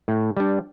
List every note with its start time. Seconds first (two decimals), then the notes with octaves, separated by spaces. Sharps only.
0.08 A2
0.37 G3 D4